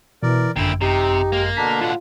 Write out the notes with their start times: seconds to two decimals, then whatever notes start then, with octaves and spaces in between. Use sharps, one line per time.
0.23 B2 E3 A#4 D5
0.56 G#1 F#2 A#2 D3 E4 G5
0.81 C3 D#4 G4
1.32 G#3 A#3
1.57 B2 D3 D4 A#5 B6
1.81 A2 F4 F#5